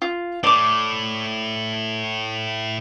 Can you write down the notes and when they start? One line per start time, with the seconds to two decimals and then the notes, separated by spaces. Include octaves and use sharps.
0.02 F4
0.44 A2 D5 D6